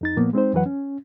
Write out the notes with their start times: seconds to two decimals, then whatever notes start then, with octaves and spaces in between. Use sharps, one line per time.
0.01 F2 D#4 A6
0.16 A#2 F3 A#3 B3
0.33 G#3 C4 D#4 C5
0.53 F2 E3 F#3 B4 F#5
0.66 C#4